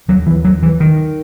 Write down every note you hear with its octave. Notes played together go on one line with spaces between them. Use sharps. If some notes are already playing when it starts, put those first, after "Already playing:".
D#2 F#3
E3
F#3
E3
D#3